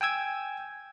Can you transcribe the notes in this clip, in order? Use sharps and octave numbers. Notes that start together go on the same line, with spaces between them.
G5 G#5 E6 G#6